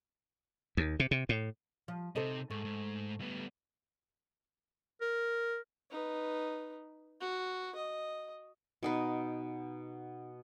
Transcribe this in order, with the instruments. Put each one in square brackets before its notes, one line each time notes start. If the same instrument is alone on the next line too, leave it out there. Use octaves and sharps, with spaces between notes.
[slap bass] D#2
C3
C3
A2
[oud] F3
[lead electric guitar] C3 [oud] D#4 A4 C5
[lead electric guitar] G#2 [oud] A3
[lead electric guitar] G#2
G3 B3
[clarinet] A#4
[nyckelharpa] D#4 B4
F#4
D#5
[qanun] B2 D#4 B4